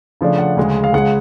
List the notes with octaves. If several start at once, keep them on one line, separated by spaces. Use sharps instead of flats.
C#3 F3 A3 D4
F#5
D2 C#3 G#3
F5
C#2 C#3 G#3 F#5